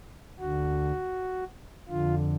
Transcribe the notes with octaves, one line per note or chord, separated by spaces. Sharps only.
D2 D3 F#4
F2 D3 F4